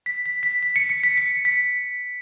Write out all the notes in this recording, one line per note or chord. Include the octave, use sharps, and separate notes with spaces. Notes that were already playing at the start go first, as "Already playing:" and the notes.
B6
B6
B6
B6
C#7
C#7
B6
C#7
B6